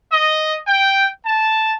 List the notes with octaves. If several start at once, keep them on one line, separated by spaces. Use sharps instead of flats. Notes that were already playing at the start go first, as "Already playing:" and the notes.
D#5
G5
A5